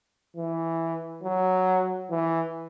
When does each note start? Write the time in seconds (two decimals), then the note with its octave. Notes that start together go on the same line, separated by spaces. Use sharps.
0.36 E3
1.24 F#3
2.11 E3